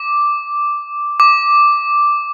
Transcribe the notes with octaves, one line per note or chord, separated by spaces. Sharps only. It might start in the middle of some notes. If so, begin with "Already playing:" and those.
Already playing: D6
D6